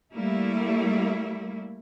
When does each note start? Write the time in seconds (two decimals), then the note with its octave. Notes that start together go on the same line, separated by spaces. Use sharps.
0.14 G3 A3 A#3 E4